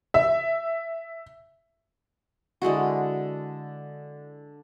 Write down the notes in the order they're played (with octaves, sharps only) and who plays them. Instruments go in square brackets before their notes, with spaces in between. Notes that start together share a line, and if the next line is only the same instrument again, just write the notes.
[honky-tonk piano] E5
[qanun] D3 G#3 E4 F#4